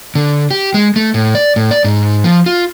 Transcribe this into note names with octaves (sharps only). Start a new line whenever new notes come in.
D3
G4
G#3
A3
A2
D5
A2
D5
G#2
F3
F4